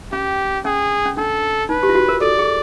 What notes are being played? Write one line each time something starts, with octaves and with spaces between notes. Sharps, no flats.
C#4 G4
C#4 G#4
C#4
D4 A4
D#4 B4
G4
F4
F#4
A#4
A4 D5
G#4